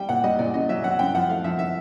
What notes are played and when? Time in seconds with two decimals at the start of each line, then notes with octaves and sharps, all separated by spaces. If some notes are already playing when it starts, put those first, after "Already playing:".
Already playing: G3 G5
0.09 A#2 F#5
0.24 G3 D#5
0.39 A#2 D5
0.53 C#3 D#5
0.69 F#3 E5
0.84 F#3 F#5
0.99 F#2 G5
1.15 F3 F#5
1.29 A3 F5
1.44 F3 E5
1.59 E5